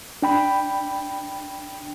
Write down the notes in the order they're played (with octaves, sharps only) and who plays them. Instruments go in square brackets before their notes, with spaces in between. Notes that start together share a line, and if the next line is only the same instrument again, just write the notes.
[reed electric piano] D4 G5 B5